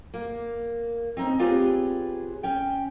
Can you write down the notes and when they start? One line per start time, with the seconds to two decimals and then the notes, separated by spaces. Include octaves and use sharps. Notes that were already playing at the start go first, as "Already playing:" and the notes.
0.14 A#3
1.17 C4 C#4 D#4
1.39 C4 F4 G4 G#4 B4 C#5
2.43 C#4 G5